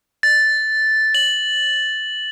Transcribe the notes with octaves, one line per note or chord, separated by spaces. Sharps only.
A6
F#7